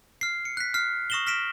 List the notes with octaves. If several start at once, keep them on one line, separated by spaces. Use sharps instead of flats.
F6 C7
C#7
F#6 B6
F6 C7
C#6 D#6 A#6 E7 F#7 G7
F6 A#6 B6 D7 E7